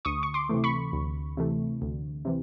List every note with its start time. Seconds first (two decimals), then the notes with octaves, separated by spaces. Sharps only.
0.05 D2 C#6 D#6
0.23 C#6
0.34 C6 D6
0.49 C3 E3 A3
0.64 B5 C#6
0.93 D2
1.37 C3 E3 A3
1.82 D2
2.25 C3 E3